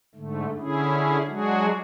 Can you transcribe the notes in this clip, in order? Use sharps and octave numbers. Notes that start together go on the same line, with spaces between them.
G#2 D3 A3
D3 C#4 E4 G#4
F#3 G#3 D4 F#4 G#4